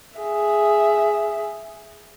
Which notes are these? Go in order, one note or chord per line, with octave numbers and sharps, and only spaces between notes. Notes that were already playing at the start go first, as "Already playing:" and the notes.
G#4 E5